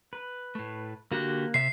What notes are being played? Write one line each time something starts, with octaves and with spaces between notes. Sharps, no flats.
B4
A2 A3
D3 A#3 F#4 G4 F#6
C3 E5 C7